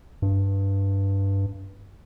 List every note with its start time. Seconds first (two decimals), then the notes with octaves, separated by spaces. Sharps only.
0.22 G2